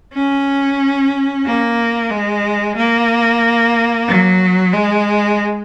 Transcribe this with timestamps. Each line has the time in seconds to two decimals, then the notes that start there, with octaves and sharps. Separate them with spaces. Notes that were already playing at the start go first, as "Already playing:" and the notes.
0.14 C#4
1.46 A#3
2.10 G#3
2.77 A#3
4.08 F#3
4.73 G#3